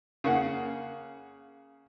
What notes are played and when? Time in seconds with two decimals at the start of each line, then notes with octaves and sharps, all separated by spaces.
0.24 C#3 A#3 F#5